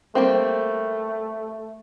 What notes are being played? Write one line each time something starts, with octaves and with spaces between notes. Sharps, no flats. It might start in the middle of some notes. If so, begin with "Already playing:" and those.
G3 A3 A#3 C4